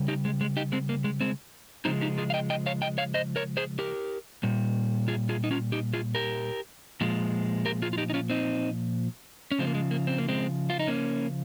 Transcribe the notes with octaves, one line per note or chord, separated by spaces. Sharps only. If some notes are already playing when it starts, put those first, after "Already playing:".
Already playing: C#3 G3
D#4 G4
G#3
G#3
D#4 G4
G#3 C4
A#3
G#3
G#3 C4
C#3 F3 G#3 C4 D#4
D#4 G4
F4 G#4
F5
D#5 G5
D#5 G5
C#5 F5
D#5 G5
C#5 F5
C5 D#5
A#4 C#5
G#4 C5
G4 A#4
A#2 G3
F4 G#4
F4 G#4
D#4
C#4 F4
D#4 G4
F4 G#4
G4 A#4
A#2 F3 G#3
G4 A#4
F4 G#4
F4
D#4 G4
D#4
C#4 F4
C4 D#4
C#4
C#3 F3 G#3 C4
A#3
G#3
A#3
C4
A#3
G#3 C4
F4
D#4
A#3 C#4